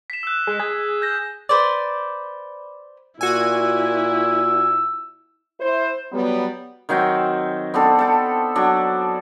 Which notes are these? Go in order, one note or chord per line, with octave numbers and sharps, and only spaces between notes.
B6 E7
E6 F#6
G#3
G#4 G#6
F#6 G6 A#6
B4 C5 D5
A#2 E4 F#4 G#5 E6
E4 C5
F#3 G3 B3
D#3 F#3 C4 G5
B3 C4 D4 A4
A4 G5
F#3 D4